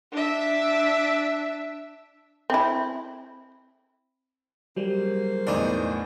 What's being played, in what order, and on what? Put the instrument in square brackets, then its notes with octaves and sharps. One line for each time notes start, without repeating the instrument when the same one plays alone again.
[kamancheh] D4 E5
[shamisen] C4 E4
[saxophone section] C#3 A#3 C5 [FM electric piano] F#3 G3
[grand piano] B1 E2 A2 [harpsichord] D4 D#4